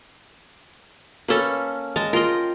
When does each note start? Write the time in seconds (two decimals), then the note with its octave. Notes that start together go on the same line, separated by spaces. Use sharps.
1.28 A#3 C#4 A4 B4
1.96 G#3 A5 A#5
2.13 F4 A#4 D#5 G5